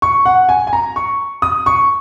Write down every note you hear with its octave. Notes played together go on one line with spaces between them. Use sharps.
C#6
F#5
G#5
G#5
A#5
C#6
D#6
C#6